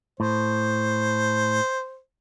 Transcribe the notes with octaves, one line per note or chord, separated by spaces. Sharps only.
A2 C5